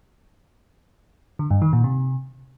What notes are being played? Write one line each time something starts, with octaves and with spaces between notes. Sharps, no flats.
D3
G2
D#3
A#2
C3